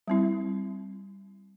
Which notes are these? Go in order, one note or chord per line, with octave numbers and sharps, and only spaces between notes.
G3 C4 E4